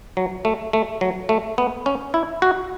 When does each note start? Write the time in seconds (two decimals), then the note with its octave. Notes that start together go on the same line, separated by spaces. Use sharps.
0.17 F#3
0.45 A3
0.73 A3
1.01 F#3
1.29 A3
1.58 B3
1.86 C#4
2.14 E4
2.42 F#4